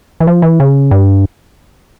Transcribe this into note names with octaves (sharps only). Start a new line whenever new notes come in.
E3
F3
E3
C#3
G2